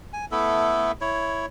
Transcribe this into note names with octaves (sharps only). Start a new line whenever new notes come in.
G#5
A3 B3 E4 A4
E4 C#5